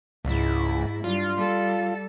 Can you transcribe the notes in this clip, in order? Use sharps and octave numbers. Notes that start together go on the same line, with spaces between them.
C#2 G#2 E4
G2 F4
G3 A4